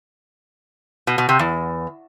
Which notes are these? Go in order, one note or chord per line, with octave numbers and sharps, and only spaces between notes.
B2
B2
C3
E2